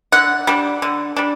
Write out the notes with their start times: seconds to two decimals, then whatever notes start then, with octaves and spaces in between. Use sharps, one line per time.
0.12 D3 F#5
0.47 G3 D4
0.82 D3
1.16 G3 D4